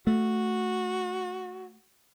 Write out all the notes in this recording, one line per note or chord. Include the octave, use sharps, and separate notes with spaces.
A3 F#4